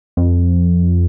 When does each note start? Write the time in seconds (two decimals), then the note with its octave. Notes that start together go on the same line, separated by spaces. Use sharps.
0.17 F2